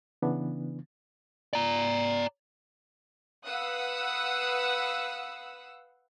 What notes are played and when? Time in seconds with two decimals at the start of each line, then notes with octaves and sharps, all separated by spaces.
0.22 C#3 E3 B3 D4
1.53 D5 A#5
3.45 B4 F5 F#5 D#6 E6 F#6